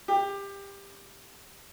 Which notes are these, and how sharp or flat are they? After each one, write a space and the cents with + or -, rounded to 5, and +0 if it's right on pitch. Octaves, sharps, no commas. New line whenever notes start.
G4 +20